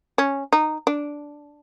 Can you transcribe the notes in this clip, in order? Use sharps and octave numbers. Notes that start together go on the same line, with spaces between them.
C#4
D#4
D4